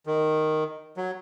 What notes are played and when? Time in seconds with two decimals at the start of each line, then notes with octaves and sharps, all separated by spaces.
0.06 D#3
0.97 F#3